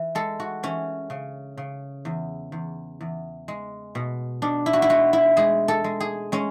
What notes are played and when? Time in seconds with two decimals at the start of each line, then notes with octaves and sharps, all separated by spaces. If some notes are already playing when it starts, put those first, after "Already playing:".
Already playing: E3
0.15 G#3 A4
0.40 F#4
0.63 E3 C#4
1.10 C#3
1.57 C#3
2.05 E2
2.52 E2
3.01 E2
3.48 G#3
3.95 B2
4.42 B2 D4
4.66 E4
4.73 F#4
4.82 E4
4.89 G#3 F#4
5.13 E4
5.37 G#3 G#4
5.68 A4
5.84 G#3
6.00 G#4
6.32 G#3 C#4